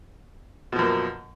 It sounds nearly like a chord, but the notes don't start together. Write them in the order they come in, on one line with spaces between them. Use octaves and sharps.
B2 F3 F#2 A#3